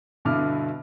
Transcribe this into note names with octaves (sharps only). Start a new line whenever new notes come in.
G2 B2 D3 E4 D6 F6